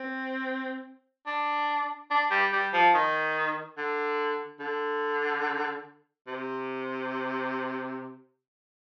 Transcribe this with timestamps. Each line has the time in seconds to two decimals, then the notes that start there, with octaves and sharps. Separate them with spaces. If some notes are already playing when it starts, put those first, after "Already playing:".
Already playing: C4
1.27 D4
2.11 D4
2.31 G3
2.52 G3
2.74 F3
2.94 D#3
3.78 D3
4.60 D3
6.27 C3